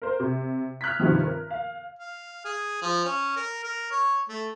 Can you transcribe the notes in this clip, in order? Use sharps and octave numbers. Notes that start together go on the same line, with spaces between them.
A#4 C5
C3
F6 F#6 G#6 B6
G2 C3 D#3 F3
A#4
F5
F5
G#4
F3
C#4
A#4
A#4
C#5
A3